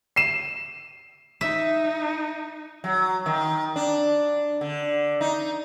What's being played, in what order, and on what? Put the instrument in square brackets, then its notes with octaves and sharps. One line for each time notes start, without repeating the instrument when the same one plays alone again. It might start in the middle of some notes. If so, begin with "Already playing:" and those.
[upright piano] C7 D#7 E7
[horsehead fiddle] D#4 [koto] E5
[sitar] F#3
D#3
D4
D3
D#4